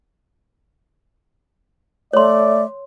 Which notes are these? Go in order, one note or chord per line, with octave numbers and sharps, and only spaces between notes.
A3 C#5 D5 C6